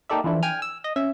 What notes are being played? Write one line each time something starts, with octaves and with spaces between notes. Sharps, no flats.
A#3 D#4 G4 A4 D5 E5
E3 F3 D4 E4 A4
G5 G#5 F6
E6
D#5
C#4 E5